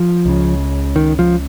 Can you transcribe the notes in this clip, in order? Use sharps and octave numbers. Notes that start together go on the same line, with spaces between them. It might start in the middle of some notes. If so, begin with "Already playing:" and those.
Already playing: F3
C#2 C#3
D#3
F3